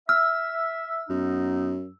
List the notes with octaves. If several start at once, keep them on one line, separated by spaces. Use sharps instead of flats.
E5 E6 F6
F#2 B3 D#4